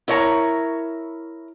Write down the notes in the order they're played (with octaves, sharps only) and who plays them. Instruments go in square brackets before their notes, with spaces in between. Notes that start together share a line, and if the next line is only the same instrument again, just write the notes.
[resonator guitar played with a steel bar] E4 A#4 C#5 D#5 A#5